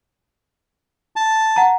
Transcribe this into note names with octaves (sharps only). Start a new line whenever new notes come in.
A5
F#5 A#5